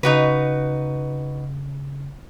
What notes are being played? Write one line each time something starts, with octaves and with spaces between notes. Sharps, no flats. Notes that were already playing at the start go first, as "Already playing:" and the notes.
C#3 D#4 F#4 B4